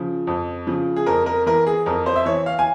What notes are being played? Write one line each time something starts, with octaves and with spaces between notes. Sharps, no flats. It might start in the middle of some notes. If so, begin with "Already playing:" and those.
Already playing: C#3 F3
F2
C#3 F3
G#4
F2 A#4
A#4
E3 A#4
G#4
F2 A#4
C5
E5
E3 C#5
F5
G#5